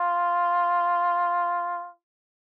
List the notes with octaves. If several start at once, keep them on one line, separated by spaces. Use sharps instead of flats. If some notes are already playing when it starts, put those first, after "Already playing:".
Already playing: F4